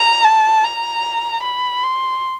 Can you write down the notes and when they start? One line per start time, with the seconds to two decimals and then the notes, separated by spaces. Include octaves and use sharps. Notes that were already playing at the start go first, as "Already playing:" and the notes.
Already playing: A#5
0.24 A5
0.64 A#5
1.44 B5
1.83 C6